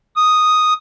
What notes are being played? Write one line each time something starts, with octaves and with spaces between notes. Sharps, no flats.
D#6